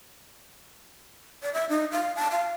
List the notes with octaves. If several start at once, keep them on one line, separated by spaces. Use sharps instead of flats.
D5
E5
D#4
F5
A5
F5